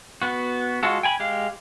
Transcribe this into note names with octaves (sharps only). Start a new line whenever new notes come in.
B3 F#4
G#3 F4 F#4 A4
G5 G#5 B5
G#3 G4 F5